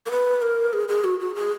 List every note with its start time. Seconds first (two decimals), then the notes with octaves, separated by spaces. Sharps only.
0.06 A#4
0.11 B4
0.42 A#4
0.73 G#4
0.88 G#4
1.04 F#4
1.20 F#4
1.35 G#4